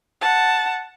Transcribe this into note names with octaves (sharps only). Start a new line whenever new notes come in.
F#5 A5